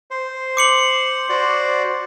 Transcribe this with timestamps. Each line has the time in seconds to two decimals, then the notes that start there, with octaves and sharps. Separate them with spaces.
0.11 C5
0.57 D6 C#7 F#7
1.29 F#4 C5 D5